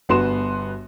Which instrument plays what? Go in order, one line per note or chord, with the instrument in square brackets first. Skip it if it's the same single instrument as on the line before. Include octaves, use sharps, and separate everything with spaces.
[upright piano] G1 B3 F#4 C6 E7